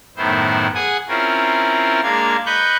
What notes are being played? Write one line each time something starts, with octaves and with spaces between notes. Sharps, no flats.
F#2 A2 D#3 B3 E4 C5
G#4 F#5 G#5 D#6
C4 C#4 E4 F4 A#4
G#3 A#3 D4 F5 G#6
B4 D#5 B5 C#6 F#6 G6